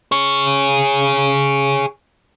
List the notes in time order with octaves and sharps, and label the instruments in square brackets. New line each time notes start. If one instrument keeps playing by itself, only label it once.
[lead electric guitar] G#4 C#5